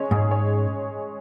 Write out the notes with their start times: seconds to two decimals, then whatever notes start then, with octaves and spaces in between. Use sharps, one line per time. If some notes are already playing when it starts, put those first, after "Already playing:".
Already playing: G#3 C#4 C#5
0.11 G#2 G#4
0.31 C#5